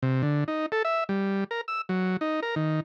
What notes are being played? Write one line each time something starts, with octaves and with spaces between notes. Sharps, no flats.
C3
D3
D#4
A4
E5
G3
A#4
E6
F#3
D#4
A#4
D#3